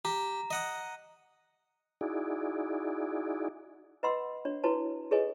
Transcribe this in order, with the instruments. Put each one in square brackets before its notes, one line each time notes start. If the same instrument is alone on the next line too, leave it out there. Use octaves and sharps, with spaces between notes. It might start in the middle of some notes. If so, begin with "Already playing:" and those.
[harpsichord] G4 [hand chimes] A#5
[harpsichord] D#5 F#5 D#6
[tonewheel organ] D#4 E4 F#4 G#4 D5
[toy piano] B4 D#5 F#5 B5 C6 E6
D4 C#5
E4 F#4 B4 C#5 A5
G#4 A4 B4 C#5 D#5 G#5